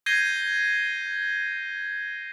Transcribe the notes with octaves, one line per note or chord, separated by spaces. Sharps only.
G6 G#6 A#6 C7 D#7 G7